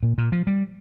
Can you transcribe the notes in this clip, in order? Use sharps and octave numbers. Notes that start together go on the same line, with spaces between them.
A#2
A#2
F3
G3